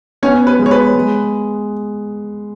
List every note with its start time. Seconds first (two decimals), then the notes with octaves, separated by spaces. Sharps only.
0.22 B3 C#4 C#5
0.47 B4
0.59 G#3
0.66 C#5
0.71 B4
0.95 G#3